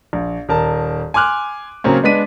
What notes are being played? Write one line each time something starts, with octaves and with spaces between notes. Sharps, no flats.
A#1
D#1 A#4 A5
G#5 C6 D6 F6 F#6
C#3 F#3 A#3 C4 C#4
G#3 B3 D4 B6 D#7